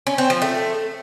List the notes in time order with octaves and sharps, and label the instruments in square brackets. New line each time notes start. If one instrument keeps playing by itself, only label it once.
[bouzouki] C#4
C4
F3
A3